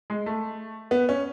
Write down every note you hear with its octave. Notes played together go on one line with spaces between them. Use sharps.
G#3
A3
B3
C#4